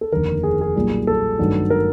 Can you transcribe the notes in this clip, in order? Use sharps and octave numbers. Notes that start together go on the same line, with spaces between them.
A4
F1 D#2 D3 A#4
G#4
G#4
B1 A#2 G3 A#3
A4
G#1 G2 D#3 F#3 A3
A#4